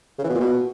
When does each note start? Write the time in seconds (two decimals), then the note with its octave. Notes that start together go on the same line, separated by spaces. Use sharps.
0.18 C#3
0.24 E3
0.29 B2
0.35 A#2
0.40 B2